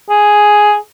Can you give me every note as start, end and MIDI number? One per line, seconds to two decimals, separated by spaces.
0.10 0.78 68